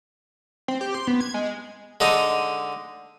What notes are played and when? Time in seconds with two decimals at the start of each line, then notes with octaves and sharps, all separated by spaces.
0.68 C4
0.81 G4
0.95 C6
1.07 B3
1.21 G#6
1.34 G#3
2.00 D3 G#3 D#4